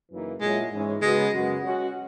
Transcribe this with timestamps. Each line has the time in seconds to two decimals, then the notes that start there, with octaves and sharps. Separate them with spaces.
0.11 F#2 C#3 E3 A#3 D#4
0.40 A#2 F#3 G#3 C#4 E4
0.72 G#2 E3 G#3 C#4
1.02 C#3 F#3 G#3 B3 F#4
1.33 F#2 C#3 G#3 B3 F#4
1.63 C#3 G#3 C#4 F#4